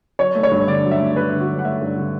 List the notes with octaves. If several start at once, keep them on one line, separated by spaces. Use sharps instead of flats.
F#3 C#5
A3
C#5
G2
D3 D5
F#3
E5
A3
G2 B4
D3
F#4
F#3
F#5
A3 E5
G2
D3